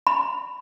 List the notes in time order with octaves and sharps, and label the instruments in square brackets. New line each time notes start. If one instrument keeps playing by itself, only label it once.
[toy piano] B5